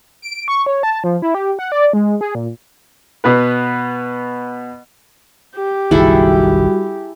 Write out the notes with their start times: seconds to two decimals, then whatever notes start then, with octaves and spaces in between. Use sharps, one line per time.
0.22 D7
0.48 C#6
0.66 C#5
0.83 A5
1.04 F3
1.22 E4
1.35 G4
1.59 F#5
1.72 D5
1.93 G#3
2.21 G#4
2.35 A#2
3.24 B2 B3 B4
5.56 G4
5.91 F#1 B1 D#3 G3 E4 F#4 G#4 A4